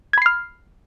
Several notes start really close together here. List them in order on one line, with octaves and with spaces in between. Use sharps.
G#6 B5 C7 F6